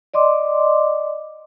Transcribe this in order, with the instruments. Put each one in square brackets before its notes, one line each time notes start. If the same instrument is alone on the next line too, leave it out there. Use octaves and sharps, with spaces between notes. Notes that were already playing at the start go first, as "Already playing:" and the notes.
[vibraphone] D5 D#5 C6 D6